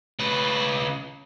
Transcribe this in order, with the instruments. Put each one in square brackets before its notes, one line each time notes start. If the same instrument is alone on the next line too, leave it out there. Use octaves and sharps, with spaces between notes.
[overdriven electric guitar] C#3 B4